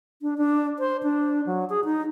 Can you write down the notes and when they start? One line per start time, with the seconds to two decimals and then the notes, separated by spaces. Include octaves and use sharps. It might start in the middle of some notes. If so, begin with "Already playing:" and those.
0.22 D4
0.38 D4
0.79 C5
1.03 D4
1.46 F#3
1.70 G#4
1.84 D#4